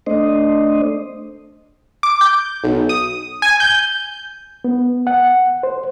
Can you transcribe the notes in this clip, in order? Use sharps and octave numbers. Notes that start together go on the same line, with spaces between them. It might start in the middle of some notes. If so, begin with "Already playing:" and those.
A3 D4 C5 D#5
D6
G6
B1
D#6
G#5
G6
B3
F#5
C5